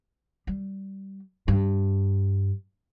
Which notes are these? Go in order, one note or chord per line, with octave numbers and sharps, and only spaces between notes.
G3
G2